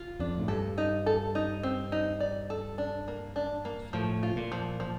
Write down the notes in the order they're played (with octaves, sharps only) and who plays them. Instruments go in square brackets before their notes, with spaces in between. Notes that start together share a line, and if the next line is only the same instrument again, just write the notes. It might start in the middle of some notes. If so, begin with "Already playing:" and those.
Already playing: [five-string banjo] F4
[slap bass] F2 [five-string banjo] D4
[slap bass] A2
[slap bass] G2 [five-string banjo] A4
[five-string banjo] D#4
A4
D#4
C4
D#4
D5
A4
D4
A#3
D4
A#3
[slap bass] A2 [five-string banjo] F3
[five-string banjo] F4
[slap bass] A#2
[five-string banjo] F3
F3